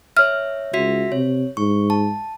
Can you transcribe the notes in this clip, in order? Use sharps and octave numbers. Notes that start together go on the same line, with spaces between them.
C#5 E5 F6
C#2 F#4 E5 B6
C3 C#5
G#2 C#6
A5